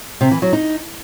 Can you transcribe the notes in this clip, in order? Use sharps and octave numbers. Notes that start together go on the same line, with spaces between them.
C3
E3
F#3
D#4